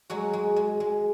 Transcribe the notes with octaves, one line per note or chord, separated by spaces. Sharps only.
F#3 G#3 F#4
G#3
G#3
G#3